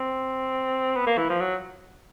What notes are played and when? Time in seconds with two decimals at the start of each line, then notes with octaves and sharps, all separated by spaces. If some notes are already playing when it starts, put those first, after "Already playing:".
Already playing: C4
0.96 B3
1.07 A#3
1.18 E3
1.29 F3
1.40 F#3